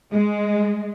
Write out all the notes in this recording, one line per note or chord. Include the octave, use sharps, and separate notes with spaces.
G#3